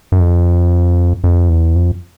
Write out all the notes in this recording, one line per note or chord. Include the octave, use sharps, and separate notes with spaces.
F#2
F2
F2
E2
F2